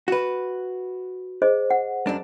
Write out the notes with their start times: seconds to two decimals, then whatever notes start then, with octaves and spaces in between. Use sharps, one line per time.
0.08 F#4 B4
1.42 G#4 C5 D#5
1.70 F#5
2.07 F#2 D4